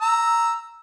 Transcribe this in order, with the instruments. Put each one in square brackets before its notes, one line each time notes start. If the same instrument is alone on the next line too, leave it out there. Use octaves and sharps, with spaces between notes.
[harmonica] A#5 E6